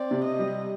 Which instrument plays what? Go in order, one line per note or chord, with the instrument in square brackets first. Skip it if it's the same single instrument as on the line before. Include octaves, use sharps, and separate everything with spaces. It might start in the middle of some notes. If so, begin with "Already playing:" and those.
Already playing: [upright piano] C4 [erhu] D5
[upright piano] C3
[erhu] D#5
[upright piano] G3